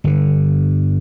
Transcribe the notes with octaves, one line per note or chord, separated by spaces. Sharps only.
G1 D3